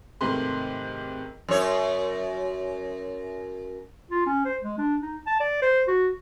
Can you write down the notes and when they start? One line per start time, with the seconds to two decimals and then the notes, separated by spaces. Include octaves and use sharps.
0.21 G#2 C3 D#3 A3 B4 C6
1.48 F#2 C#5
4.11 F4
4.26 C#4
4.45 C5
4.62 G#3
4.78 D4
5.02 D#4
5.27 A5
5.40 D5
5.62 C5
5.87 F#4